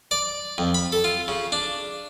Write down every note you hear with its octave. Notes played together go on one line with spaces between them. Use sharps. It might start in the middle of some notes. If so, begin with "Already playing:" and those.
D5
F2
B5
A4
F4
C#3
D4